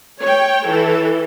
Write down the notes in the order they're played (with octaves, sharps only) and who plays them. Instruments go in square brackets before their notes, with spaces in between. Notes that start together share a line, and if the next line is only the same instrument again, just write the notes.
[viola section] C#5 G5
E3 A4